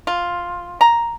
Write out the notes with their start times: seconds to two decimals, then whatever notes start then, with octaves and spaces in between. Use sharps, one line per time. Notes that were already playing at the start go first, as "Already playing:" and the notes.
0.07 F4
0.81 A#5